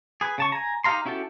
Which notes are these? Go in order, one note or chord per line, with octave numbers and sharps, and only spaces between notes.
G#4 B4
C#3 A5 C#6
G#5 A#5
D#4 G4 F5 A#5 C6
C#4 E4 F#4 G4 A4